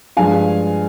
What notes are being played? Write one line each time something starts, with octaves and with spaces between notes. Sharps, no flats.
G2 F3 G#3 F5 G#5